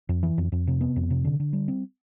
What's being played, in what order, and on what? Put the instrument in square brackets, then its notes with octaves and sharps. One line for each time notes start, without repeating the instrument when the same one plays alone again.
[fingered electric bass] F2
E3
F2
F2
C3
B3
F2
C3
D3
D3
G3
C4